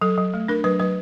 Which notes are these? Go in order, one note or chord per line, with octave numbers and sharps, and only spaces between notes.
F#3 A4
F#3
A3
D4 A#4
F#3 B4
F#3 B4